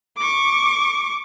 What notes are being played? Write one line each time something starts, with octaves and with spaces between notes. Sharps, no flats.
C#6 D6